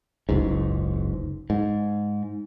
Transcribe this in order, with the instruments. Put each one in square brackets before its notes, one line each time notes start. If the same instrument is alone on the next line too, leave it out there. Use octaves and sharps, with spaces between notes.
[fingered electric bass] F#1 C#2 G#2
G#2